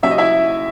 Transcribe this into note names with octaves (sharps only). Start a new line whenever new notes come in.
D#2 C#3 F#3 E5
D#5
E4 E5